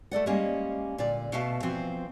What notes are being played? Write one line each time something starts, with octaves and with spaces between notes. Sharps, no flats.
A3 A4 D5 F#5
G3 G#3 A#3 C#4
A#2 D3 D5
B2 A3 F5 A5
E3 F3 C4 F#4